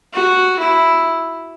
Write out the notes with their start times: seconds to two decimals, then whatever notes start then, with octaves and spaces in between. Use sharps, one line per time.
0.14 F#4
0.59 E4